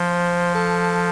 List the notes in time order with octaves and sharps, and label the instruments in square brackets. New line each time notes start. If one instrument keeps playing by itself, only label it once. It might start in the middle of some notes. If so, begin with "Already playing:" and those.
Already playing: [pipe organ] F3 [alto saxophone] C5
[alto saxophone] A4